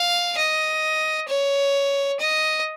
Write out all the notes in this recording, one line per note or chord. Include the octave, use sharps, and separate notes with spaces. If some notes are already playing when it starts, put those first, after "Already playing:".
Already playing: F5
D#5
C#5
D#5